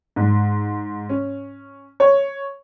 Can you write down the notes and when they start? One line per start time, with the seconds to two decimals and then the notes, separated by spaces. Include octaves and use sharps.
0.16 G#2
1.09 C#4
2.00 C#5